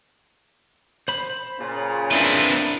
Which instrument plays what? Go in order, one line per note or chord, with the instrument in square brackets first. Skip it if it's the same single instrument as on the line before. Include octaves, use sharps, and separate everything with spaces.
[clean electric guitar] C5 B5
[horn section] A#2 C#3 F4
[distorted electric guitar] C4 B4 [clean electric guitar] D4 E4